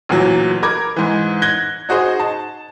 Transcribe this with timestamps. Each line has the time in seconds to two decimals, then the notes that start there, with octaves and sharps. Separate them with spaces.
0.09 D2 A#2 E3 F#3
0.63 A#4 B5 D6 G#6
0.96 G#2 E3
1.42 F#6 G#6 A#6 G7
1.89 D#4 F#4 G#4 C5 D#5
2.19 A5